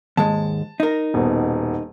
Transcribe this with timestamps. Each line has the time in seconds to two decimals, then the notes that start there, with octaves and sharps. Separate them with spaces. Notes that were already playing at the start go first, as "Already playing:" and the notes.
0.17 D#2 G#2 G#3 A5
0.80 D#4 A#4
1.14 D#1 B2